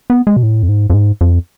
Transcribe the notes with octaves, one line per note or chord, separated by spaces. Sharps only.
B3
G#3
B2
A2
F2
G#2
F2
G#2
F2